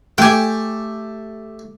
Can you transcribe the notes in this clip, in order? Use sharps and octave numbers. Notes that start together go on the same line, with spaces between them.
A3 G4 G5 G#5